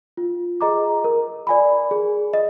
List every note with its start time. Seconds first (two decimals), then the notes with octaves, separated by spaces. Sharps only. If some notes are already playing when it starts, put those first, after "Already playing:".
0.17 F4
0.61 G#4 D#5 A#5 D6
1.04 A#4
1.47 D5 G#5 B5
1.91 G#4
2.33 D#5